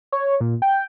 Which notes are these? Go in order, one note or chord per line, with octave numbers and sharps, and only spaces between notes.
C#5
A#2
G5